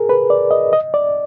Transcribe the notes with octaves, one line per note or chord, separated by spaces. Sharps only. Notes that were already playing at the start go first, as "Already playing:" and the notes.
Already playing: G#4 A#4
B4
D5
D#5
D#5
D5